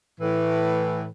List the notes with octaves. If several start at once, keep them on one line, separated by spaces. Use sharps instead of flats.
A2 E3